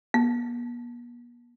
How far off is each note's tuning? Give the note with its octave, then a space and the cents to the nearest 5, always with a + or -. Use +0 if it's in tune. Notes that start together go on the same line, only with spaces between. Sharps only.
B3 -45